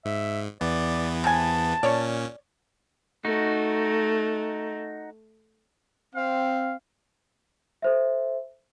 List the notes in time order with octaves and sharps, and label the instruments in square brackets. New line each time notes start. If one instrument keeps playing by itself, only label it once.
[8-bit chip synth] G#2 [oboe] E5
[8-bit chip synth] E2 E3 B3 [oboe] D5
[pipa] C3 G#5 [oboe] A5
[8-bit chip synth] A#2 C#4 [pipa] C#5 D5
[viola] A3 [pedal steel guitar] D#4 F#4
[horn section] C4 F5
[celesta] A4 C5 E5